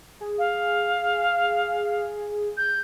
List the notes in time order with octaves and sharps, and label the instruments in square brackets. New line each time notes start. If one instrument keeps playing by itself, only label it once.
[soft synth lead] G#4
[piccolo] F5
G6